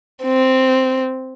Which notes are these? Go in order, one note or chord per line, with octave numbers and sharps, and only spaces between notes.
C4